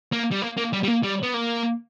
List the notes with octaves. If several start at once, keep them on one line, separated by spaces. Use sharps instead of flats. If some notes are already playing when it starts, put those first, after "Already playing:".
A#3
G3
A#3
A#3
G3
G3
A#3
G3
B3
A#3